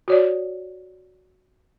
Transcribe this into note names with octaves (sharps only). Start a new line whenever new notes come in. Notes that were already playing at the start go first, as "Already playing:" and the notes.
F#4 C#5 D5